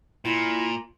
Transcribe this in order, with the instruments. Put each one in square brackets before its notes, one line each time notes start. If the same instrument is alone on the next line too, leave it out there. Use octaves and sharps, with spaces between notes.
[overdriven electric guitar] A#2 [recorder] E4